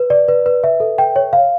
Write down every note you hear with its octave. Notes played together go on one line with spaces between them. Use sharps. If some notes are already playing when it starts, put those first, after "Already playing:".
Already playing: B4
D5
B4
B4
E5
A4
G5
C#5
F5